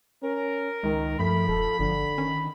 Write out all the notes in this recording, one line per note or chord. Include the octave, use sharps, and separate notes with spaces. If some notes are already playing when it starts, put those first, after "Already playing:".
C#4 A#4
C#2 D#3 G#3
G2 F3 A3 B5
E1 A4
G1 D3
D#3 C#4